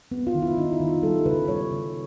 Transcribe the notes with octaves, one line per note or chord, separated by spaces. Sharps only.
B3
F4
D#3
E4
D#3 D#4
E4
D#3
F4
G3 A4
C#3 B4
G3 C#5
C#3